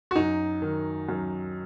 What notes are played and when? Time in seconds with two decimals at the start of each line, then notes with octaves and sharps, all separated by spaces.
0.11 F#4
0.16 F#2 D#4
0.62 D#3
1.09 F#2